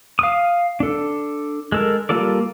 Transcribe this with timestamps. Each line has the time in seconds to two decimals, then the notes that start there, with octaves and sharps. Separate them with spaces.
0.19 F5 D#6
0.80 D4 A4
1.72 G#3 A4 A#4
2.09 G3 A#3 F4 A4 D5